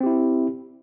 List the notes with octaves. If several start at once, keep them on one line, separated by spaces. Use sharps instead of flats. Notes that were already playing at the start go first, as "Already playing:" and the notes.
C4 E4 G4